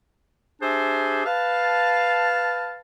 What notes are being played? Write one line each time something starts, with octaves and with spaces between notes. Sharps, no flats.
D4 G4 G#4 C5 E5 G#5
B4 F5 A5